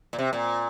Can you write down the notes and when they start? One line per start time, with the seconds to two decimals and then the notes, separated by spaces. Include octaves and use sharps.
0.13 A#2
0.19 C3
0.33 A#2